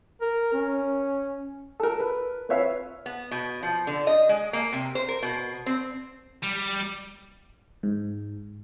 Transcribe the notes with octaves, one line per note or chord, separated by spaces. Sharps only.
A#4
C#4
A4 A#4
B4
C4 B4 C#5 E5 F5
B3
B2
F3
D3
D#5
G#3
A#3
C3
C5
A#4
B2
C4
G3
G#2